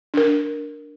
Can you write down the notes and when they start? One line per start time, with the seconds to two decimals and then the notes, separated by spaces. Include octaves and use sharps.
0.14 D4 A#4